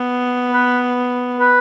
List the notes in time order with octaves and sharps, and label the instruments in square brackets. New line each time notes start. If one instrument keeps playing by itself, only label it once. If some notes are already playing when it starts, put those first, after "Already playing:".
Already playing: [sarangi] B3
[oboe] B4
B4